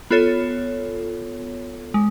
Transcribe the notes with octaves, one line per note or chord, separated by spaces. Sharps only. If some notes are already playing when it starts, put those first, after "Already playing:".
B3 F4 A4 C#5
G#3